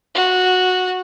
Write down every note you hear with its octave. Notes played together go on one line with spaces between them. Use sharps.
F#4